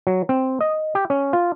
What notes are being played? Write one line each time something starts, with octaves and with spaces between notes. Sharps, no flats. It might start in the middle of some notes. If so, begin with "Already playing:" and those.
F#3
C4
D#5
G4
C#4
F4